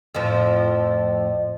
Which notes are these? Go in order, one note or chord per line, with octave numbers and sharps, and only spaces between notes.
F2 A2 F3